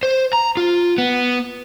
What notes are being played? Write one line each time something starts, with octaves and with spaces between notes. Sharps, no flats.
C5
A#5
F4
B3